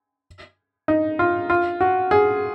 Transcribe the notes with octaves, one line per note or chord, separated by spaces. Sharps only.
D#4
F4
F4
F#4
G#4